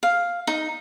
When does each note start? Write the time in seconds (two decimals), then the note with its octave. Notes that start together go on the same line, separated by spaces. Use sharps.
0.03 F5
0.47 D#4